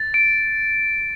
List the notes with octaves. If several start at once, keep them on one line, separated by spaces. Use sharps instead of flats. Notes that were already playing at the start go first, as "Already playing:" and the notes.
Already playing: A6
D7